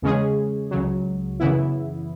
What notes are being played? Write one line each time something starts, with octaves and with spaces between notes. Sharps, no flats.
E2 C#3 G#3 C#4 G#4
C#2 C#3 F#3
F#2 C#3 E3 B3 E4